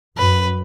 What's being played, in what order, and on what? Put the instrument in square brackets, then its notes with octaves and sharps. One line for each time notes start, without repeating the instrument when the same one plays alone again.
[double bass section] F#2 [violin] B4